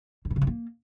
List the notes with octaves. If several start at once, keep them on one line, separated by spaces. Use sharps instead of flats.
D3
A#2
C#3
G#2
A#3